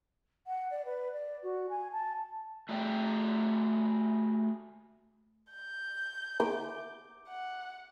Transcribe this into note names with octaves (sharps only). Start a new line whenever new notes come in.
F#5
D5
B4
D5
F#4
G#5
A5
A3 F#4 G#4 D5 G5
G6
D6
F#5